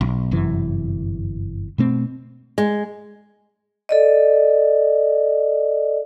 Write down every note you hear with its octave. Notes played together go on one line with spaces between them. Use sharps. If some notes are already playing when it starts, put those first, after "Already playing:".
B1
G1 F#2 C3 E3
B2 A3 C4
G#3
A4 D5 D#5